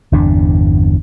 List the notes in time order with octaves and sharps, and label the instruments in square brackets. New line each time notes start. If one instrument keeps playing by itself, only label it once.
[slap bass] G1 E2 C3 D4